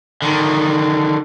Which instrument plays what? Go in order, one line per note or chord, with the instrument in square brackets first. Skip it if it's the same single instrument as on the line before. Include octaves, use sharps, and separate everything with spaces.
[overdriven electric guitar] D3 D#3